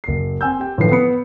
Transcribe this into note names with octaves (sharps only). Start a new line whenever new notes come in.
F#1 C7
C4 G#5 E6 G6
G4 G5
A2 D3 E3 F3 B4 C7
B3 B4 B5 D#6 C#7